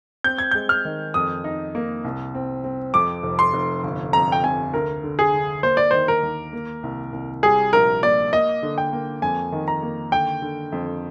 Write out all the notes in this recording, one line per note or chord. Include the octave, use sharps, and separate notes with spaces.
C4 G6
G#6
G#3 G6
F6
D#3
F2 D#6
D#4
A#3
C2
C4
C4
F2 D6
F1
C6
F1
G1
F2 A#5
G5
C3 G#5
D2 A#4
D3
G#4
D3
A#3 C5
D5
D#3 C5
A#4
D#2
A#3
C2
C2
G3 G#4
A#1 A#4
A#3 D5
A#3 D#5
D3
G5
A#3
F2 G#5
D#3
A#5
A#3
D3 G5
D3
F2